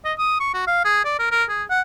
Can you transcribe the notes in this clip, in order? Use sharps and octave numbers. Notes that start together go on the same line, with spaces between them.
D#5
D#6
C#6
F#4
F5
G#4
D5
A#4
A#4
G#4
F#5